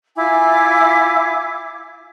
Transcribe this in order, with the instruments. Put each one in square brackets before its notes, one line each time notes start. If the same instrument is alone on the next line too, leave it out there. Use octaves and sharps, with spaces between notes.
[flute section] E4 F4 G#5 D6